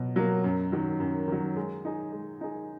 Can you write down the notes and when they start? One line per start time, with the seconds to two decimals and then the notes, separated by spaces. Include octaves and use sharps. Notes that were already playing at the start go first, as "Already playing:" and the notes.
Already playing: B2 F#3
0.16 F#3 A#3
0.44 F#2
0.72 D#3 F#3
1.00 F#2
1.28 D#3 F#3
1.56 G#3
1.85 D#4 G#4
2.12 G#3
2.41 D#4 G#4